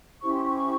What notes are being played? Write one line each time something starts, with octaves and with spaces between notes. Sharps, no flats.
C#4 E4 G4 C5 C#6
C6
C#6
C#6